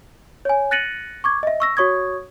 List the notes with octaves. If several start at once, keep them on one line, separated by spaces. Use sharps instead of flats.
C#5 G#5
F#6 A6 A#6 C#7 D#7 F#7
C#6 D6 G#6
D#5 E5
C#6 E6 A#6
F#4 C#5 C#6 D#6 G#6